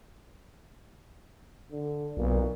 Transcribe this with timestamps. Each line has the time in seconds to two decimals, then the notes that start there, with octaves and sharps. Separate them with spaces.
1.71 D3
2.17 B1 A#2